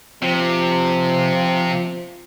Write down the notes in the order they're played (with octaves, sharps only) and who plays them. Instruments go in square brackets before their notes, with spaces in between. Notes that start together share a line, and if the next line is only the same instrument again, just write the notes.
[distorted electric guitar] C3 [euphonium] F3